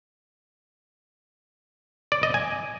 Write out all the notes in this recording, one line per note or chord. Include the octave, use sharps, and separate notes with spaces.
D5
D#5
G#5